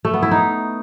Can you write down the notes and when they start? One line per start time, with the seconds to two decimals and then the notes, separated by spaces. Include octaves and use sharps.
0.05 A3
0.14 B3
0.22 E4
0.31 D#4